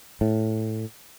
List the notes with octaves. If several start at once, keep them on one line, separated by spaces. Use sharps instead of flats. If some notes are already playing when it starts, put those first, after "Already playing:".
A2